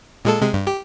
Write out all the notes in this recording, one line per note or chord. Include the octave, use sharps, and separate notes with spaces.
A#2 G#3 A4
C3 G#3
G2
G4